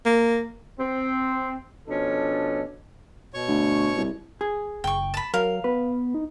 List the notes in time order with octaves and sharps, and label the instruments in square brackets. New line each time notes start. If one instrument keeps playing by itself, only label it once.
[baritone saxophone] A#3
[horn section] C4
B2 F3 C#4 D4 A4
[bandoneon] B2 C#5 C#6
[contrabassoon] D2
C2
[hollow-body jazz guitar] G#4
[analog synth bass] F#1 [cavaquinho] G5 C#6
[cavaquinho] A5 B5
[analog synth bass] F#3 [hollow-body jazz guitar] A#4 [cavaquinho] F5
[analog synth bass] B3 [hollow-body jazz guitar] B4
[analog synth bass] D#4